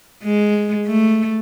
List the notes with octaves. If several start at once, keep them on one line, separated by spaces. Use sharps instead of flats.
G#3
A3